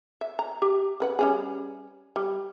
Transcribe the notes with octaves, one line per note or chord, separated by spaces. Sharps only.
E5
A#5
G4
C#3 B4 F#5
G3 C#4 G#4
G3